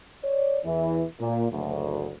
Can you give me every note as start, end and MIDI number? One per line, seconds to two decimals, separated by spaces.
0.24 0.58 73
0.24 0.58 74
0.65 1.03 40
0.65 1.03 52
1.20 1.45 46
1.51 2.12 30
1.51 2.12 38